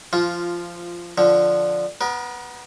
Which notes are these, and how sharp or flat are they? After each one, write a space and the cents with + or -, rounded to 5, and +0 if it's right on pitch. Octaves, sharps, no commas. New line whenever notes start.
F3 -15 F4 +0
D3 +0 F3 +0
B3 +0 A#4 +35